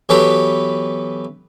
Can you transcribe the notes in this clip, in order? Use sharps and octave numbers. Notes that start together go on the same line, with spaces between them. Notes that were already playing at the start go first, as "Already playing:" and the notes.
E3 F#3 B3 G4 A4 B4